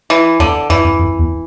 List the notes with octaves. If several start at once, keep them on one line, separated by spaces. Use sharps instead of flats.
E3
E2 D3
F2 E3
F2
F2
E2